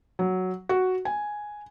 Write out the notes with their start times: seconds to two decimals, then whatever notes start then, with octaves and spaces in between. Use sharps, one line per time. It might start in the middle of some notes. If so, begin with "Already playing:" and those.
0.19 F#3
0.69 F#4
1.05 G#5